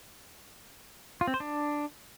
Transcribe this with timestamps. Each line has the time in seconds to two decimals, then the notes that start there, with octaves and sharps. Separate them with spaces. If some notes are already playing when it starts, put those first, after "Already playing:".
1.21 F4
1.27 C4
1.34 C5
1.40 D4